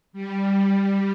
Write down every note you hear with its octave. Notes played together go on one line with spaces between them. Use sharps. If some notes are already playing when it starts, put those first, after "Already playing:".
G3